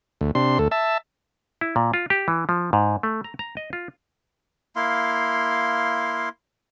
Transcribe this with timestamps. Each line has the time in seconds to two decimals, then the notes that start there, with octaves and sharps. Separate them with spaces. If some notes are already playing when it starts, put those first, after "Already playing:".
0.21 D2
0.35 C3 D4 C6
0.59 D2 A4
0.71 E5 A5
1.61 E4
1.76 A#2
1.94 F4
2.10 G4
2.28 E3
2.49 F3
2.73 G#2
3.03 A3
3.24 A#5
3.39 A#5
3.57 D#5
3.73 F4
4.76 A#3 E4 F5 C6